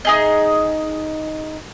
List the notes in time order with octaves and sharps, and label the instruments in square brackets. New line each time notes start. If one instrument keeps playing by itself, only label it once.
[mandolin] D#4 G#4 D#5